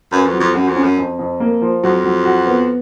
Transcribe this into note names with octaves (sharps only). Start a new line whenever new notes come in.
F#2 B4
F2
F#3
F2
F#2 F#4
F2
C#4
F#2
F2
F2
A#3
F3
F2 F#3
F#3
F#4
B3